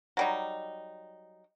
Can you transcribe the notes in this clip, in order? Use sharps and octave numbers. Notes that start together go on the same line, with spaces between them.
F#3 G3 D#4